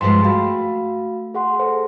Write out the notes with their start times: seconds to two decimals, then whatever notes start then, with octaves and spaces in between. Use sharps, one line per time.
0.01 G2 F3 G#3 G5 C6
0.24 A3 F#4 F5 B5
1.34 G#4 F#5 C6
1.59 A4 C5